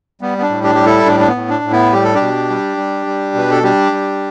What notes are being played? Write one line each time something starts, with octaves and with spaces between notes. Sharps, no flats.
G3 B3
B3
D4
A2
D4 G4
G3 G4
E4 A4
A2 D4
D4
B3
A2
D4
A2
B3 E4
G3 G4
A4
D4 G4
B2
G3
G3
G3
B2 B4
A4
G3 D4 G4
G3